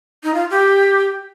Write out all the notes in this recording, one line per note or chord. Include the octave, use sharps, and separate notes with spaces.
D#4
F4
G4